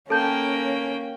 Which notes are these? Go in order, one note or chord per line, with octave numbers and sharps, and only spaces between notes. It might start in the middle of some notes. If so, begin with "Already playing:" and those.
A#3 C#4 A4 G5 A5 G6